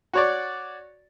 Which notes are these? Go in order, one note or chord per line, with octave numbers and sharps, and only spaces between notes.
F#4 C#5 D5